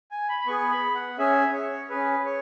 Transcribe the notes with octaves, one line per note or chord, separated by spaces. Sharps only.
G#5
B5
B5
B3 G#4 C#6
B5
F#5
C#4 G#4 E5
C#5
C#4 G#4 B4
C#5